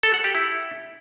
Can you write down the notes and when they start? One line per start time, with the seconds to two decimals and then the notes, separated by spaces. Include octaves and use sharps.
0.03 A4
0.14 F#5
0.24 G4
0.35 E4